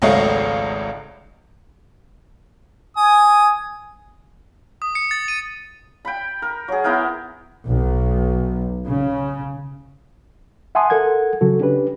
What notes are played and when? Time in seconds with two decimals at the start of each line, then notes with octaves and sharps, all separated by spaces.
0.02 G#1 C#2 F#3 A3 D#5 F5
2.97 G#5 D#6
4.82 D#6
4.95 C#7
5.11 A6
5.28 D#7
6.05 G5 B5
6.42 A#4
6.68 F#3 G#4
6.84 B3 E4 A#4 G5
7.67 B1
8.86 C#3
10.75 E5 F#5 G#5 A5 C6 D#6
10.90 A4 A#4 F#5 G#6
11.41 C#3 F#3 F#4 A4
11.60 C#4 D4 G4 B4